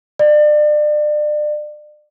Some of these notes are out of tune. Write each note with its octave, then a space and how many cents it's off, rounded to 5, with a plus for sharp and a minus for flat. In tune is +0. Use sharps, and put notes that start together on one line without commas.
D5 +35